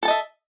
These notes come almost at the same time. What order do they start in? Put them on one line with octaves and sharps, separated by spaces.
A4 A5 D#5 E5